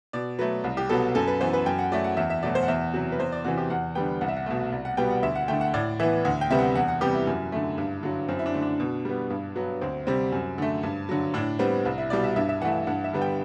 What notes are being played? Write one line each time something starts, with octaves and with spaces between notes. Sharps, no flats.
B2 D5
F#3 A3 B4
C2
G4
B2 F#3 B3 A4
F#2 A4
B4
E3 B3 C5
B4
F#2 G5
F#5
F#3 A3 D5
F#5
E2 E5
E5
B2 F#3 A3 D5
C5
F#5
E2 E5
C3 F#3
B4
E2 C5
D5
C3 E3 F#4
G4
E2 F#5
D3 G3 B3 G5
C2 F#5
E5
F#5
B2 A3
C2
F#5
B2 G3 B3 G5
F#5
D2 E5
F#5
D3 A3 G5
F#5
A2 D5
E3 B3 E5
D2 F#5
G5
C3 G3 B3 E5
F#5
E2 F#5
F#5
C3 G3 B3 G4
E4
F#2
D3 A3
G2
D3 F#3
F#2 C4
E4
D4
D3 A3
D4
B2
G3 B3
G2
F#3 B3
D2 C4
C3 G3 C4
F#2
D3 A3
G2
D3 F#3
A2 D4
G3 B3 C4
C2
E4
B2 G3 D5
E5
G2 E5
E5
E3 A3 F#5
G2 F#5
E5
D3 G3 B3
G5